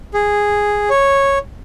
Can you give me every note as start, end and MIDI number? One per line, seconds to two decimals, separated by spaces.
0.14 0.89 68
0.90 1.39 73